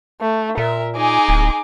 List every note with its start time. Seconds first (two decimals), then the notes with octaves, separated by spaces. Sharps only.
0.21 A3
0.58 A#2 A#4 E5
0.96 D#4 G#4 G#5 D6
1.29 D1